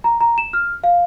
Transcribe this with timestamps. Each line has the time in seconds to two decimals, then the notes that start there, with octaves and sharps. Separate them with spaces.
0.04 A#5
0.21 A#5
0.38 E7
0.53 F6
0.84 F5